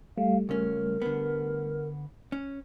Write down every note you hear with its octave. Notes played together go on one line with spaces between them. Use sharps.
G3 A3 F5
C#2 C#4 A#4
D3 B3
C#4